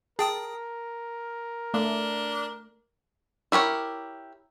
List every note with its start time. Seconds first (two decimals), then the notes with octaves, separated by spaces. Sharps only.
0.19 G#4 A#4 G5 A5 D#6
1.74 A3 D4
3.52 E4 G4 A#4 C#5